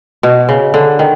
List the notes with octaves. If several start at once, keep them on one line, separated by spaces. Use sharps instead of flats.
B2
C#3
D3
D#3